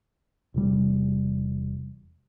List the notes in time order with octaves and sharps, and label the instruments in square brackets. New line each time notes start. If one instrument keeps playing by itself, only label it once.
[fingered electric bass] E1 C3 G3